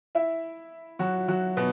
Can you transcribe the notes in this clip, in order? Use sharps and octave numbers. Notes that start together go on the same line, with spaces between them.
E4 E5
F#3 F#4
F#3 F#4
B2 B3